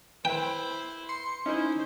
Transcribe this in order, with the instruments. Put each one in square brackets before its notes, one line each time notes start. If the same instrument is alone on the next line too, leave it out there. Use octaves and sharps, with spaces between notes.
[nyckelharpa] E4 C5 [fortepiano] B4 [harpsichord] G5
[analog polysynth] C6 C#7
[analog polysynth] C#4 E4 [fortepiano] D#4 [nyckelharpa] C5